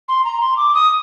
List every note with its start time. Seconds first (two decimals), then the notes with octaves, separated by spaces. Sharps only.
0.09 C6
0.24 A#5
0.41 C6
0.57 D6
0.74 D#6